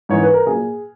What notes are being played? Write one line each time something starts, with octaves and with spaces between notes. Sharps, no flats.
G#2 E3 C#5
B4
A#4
A#2 F#3 G#4